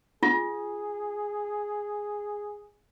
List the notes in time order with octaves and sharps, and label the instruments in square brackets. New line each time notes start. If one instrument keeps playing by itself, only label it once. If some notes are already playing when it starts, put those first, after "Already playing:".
[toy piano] F4 [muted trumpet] G#4